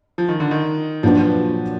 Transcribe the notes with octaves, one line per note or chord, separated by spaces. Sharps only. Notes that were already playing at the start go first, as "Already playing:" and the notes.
F3
D#3
D3
D#3
A#2 F3 F#3 D4 F#4 B4